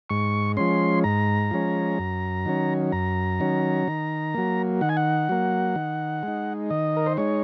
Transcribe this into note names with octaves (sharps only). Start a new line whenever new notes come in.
G#2 C#6
F3 G#3 C#4 C6
G#2 A#5
F3 G#3 C#4
F#2
D#3 F#3 C#4
F#2 A#5
D#3 F#3 C#4
D#3
F#3 A#3
D#3 F#5
G#5
F#5
F#3 A#3
D#3
G#3 D#4
D#3 D#5
A#4
C5
G#3 D#4 C#5